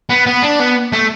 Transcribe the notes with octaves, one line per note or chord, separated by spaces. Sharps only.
B3
B3
D4
B3
A3